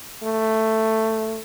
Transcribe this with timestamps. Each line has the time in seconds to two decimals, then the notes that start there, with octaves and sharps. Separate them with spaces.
0.23 A3